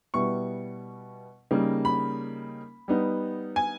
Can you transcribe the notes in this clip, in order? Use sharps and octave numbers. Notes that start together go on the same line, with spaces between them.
B2 G3 B3 E4 C#6
C#3 G3 A#3 D#4
B5
G3 B3 D#4
G#5